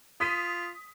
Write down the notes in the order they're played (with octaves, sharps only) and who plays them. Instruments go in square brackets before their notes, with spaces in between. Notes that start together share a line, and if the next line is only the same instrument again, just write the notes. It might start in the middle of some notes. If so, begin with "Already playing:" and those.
[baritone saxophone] F4 [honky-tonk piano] D#6 B6 D#7